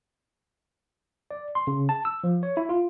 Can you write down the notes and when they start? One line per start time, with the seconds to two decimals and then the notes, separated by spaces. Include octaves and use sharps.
1.31 D5
1.55 C6
1.67 C#3
1.89 A5
2.05 E6
2.24 F3
2.43 C#5
2.57 E4
2.69 F4